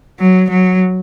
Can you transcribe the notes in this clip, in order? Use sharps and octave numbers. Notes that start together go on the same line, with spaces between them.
F#3
F#3